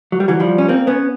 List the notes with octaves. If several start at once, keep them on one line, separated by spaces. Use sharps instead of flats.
F#3
G3
E3 F#3
F3 G3
C#4
A#3 C4
B3 C#4